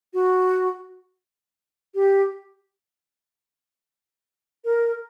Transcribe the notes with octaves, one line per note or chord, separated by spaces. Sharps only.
F#4
G4
A#4